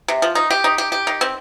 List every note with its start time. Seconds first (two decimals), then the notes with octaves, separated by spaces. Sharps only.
0.08 C3
0.22 F3
0.35 D#4
0.51 G4
0.64 D#4
0.78 G4
0.92 G4
1.07 D#3
1.21 C4